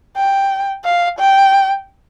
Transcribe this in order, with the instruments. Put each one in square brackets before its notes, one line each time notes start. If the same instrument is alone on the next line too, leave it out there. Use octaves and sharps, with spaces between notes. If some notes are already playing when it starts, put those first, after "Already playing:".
[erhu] G5
F5
G5